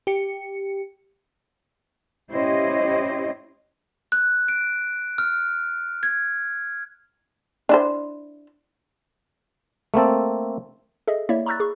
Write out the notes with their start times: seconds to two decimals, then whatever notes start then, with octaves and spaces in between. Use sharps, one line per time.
0.07 G4 C#7
2.31 C#4 E4 G4 C5 C#5 D#5
4.12 F#6
4.48 D7
5.18 F6
6.03 G#6
7.69 D4 E4 C5
9.94 A3 A#3 C4 A4
11.08 G#4 A4 D#5 E5
11.29 A#3 E4 C#5 D5 E5
11.46 A#5 B5 C#6 E6 F#6 A6
11.60 G#4 C#6